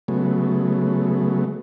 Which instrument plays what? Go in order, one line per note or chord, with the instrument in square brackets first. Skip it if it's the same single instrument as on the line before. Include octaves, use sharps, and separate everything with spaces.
[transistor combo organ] C#3 F#3 G#3 A3 B3